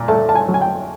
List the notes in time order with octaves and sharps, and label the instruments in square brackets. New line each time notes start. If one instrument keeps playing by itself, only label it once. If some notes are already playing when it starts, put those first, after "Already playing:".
Already playing: [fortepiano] A#2
A3 A5
A5
G#5
F#3
G#5
G5